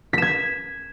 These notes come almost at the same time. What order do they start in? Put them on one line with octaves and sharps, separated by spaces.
B6 E7 G#6